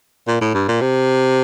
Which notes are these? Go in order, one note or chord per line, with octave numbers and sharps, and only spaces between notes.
A#2
A2
G2
A#2
C3